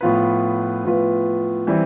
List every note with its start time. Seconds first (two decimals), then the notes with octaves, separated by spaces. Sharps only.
0.01 A2 F3 B3 F4 B4
0.84 A2 F3 B3 F4 B4
1.67 E3 G3 C4 E4